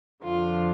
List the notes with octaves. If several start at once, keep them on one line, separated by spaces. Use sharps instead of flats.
F2 D3 F3 F4